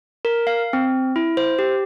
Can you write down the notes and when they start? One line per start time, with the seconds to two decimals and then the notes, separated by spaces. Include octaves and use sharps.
0.25 A#4
0.47 F5
0.73 C4
1.16 E4
1.37 C5
1.59 G4